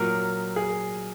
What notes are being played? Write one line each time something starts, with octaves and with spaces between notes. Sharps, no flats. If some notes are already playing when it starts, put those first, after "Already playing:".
Already playing: A#2 F#3 A#4
G#4